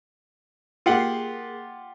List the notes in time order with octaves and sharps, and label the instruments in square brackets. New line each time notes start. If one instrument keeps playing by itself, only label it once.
[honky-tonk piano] A#3 G#4 C7 [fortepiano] F4 G4 F#5